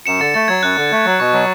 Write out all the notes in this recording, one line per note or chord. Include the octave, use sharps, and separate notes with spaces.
F#2 C#7 E7
D3 A6 C#7
A3 A6
F#3 G#6
F#2 F#6
D3
A3
F#3
B2 C#6
F#3